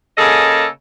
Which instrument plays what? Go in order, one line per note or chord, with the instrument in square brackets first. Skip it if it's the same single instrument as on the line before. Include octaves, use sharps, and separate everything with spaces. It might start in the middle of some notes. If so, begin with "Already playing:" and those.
[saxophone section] C#3 A#3 G#4 A4 D#5